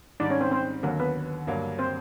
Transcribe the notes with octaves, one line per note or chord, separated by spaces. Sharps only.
G#2 D#3 G3 D4 D5
C#4 C#5
C4 C5
C4 C5
D#2 D3 F#3 A#3 A#4
B3 B4
G2 D3 F#3 A#3
C4 C5